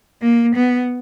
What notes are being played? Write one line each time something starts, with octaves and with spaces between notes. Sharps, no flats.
A#3
B3